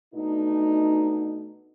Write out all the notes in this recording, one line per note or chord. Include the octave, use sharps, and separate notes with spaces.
B2 A3 D4 D#4